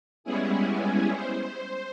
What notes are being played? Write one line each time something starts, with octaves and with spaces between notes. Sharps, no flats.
G3 G#3 B3 C#4 E4 G#4
C5